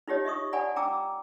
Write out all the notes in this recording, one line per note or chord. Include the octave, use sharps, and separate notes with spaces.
D#4 F4 G4 C#5 D#5
D#5 E5 C#6 D#6
D5 F#5 G#5 A5 B5
G5 A#5 D6 E6